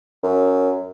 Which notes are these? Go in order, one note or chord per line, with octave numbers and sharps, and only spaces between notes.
F#2